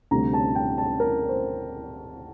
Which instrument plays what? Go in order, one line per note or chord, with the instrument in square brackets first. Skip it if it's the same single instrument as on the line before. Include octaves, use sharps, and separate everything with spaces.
[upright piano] D2 C3 G3 A#5
A5
G5
A5
A#4
C5